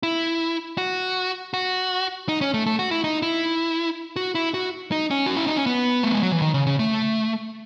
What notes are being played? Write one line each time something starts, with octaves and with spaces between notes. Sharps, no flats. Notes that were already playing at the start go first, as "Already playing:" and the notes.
E4
F#4
F#4
D#4
C#4
A3
A3
F#4
E4
D#4
E4
F#4
E4
F#4
D#4
C#4
F#4
E4
D#4
C#4
B3
A3
G#3
F#3
E3
D#3
C#3
C#3
A3